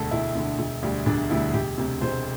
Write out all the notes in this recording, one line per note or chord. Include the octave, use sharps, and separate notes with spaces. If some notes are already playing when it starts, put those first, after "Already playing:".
Already playing: E1 D2 D3 A4
E1 E4
D2 D3
E1
D2 D3 G3
E1 D4
D2 D3 G3 E4
E1 G4
D2 C3
E1 C5